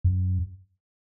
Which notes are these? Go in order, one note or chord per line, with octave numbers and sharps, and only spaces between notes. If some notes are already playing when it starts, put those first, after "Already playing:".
F#2